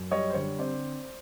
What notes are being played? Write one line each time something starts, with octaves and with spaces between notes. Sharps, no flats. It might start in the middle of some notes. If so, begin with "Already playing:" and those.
Already playing: F#2
G3 C#5 D#5
C5
D3 C#5
C4 C5 D5